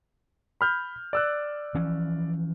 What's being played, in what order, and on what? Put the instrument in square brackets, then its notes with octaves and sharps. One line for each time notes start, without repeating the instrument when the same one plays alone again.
[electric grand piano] B5 F6 G6
D5 E6 F#6
[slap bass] E3 F3 C#4